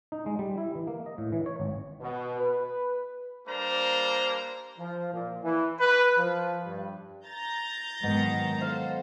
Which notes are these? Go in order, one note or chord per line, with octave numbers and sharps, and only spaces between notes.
D#4
G#3
G3
E4
E3
A#3
D#5
A2
E3
C#5
G#1
B2
B4
G3 A#3 D4 C5 A#5
F3
A#2
E3
B4
F3
G2
A#5 G6 A6
G#2 B2 D#3 F#3 B3
A4 C5 F5